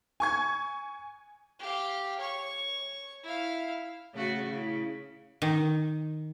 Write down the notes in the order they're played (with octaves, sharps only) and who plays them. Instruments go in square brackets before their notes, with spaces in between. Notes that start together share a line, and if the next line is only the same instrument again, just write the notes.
[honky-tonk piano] G#5 C#6 G#6
[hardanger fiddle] G4 F5
C#5 C#6
E4 F5
[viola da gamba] C#3 A3 F#4
C#3 E4
[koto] D#3